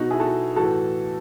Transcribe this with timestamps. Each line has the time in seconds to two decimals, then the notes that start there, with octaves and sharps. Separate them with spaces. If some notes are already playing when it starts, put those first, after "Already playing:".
Already playing: B2 D#4 F#4
0.11 E4 G#4
0.20 F#4 A4
0.56 A2 E3 F#4 A4